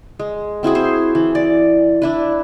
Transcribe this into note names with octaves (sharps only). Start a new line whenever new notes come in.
G#3
C4 E4 F#4 G#4
C5
E3
D5
D4 E4 B4